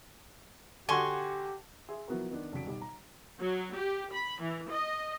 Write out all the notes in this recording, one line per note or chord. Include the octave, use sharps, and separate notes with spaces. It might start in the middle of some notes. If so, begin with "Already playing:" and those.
D3 F#4 G4 G#5 C6 C#6
G#4 E5 C6
F3 F#3 B3 E4 F#4 A#4
D#3 B3 D4
F1 C#3 F#3 B6 D7
B1 G3
A#5
F#3
G4
B5
E3
D#5